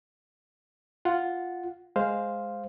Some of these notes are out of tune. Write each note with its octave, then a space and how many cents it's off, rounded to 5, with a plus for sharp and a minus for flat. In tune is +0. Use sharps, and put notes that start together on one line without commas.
F4 +0 F#5 +0
G#3 +0 C5 +0 F5 +0